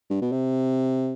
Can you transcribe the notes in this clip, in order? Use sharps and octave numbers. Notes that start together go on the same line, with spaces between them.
G2
B2
C3